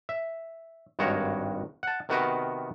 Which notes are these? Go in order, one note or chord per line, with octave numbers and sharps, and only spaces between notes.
E5
G#1 G2 G#3 F#4 A#4 C#5
F#5 A5
C3 D#3 B3 F#4 A#4 B4